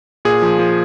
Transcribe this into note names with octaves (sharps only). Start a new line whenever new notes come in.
A#2 G#4
F3
F3